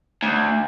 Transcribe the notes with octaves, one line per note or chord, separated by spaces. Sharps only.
D2